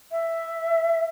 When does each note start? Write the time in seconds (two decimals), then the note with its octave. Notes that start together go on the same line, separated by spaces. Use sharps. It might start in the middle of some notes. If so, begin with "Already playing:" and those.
0.11 E5